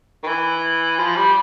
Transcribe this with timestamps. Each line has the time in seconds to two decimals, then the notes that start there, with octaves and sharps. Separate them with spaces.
0.23 D#3
0.28 E3
0.99 F3
1.16 G3